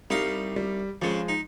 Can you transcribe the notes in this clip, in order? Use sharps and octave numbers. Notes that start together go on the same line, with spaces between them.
C2 G3 D#4 F5
G3
F2 C#3 F3 G#3
D#4